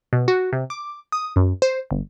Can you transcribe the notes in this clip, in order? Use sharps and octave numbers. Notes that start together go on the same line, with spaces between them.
B2
F#4
C3
D6
D#6
F#2
C5
G1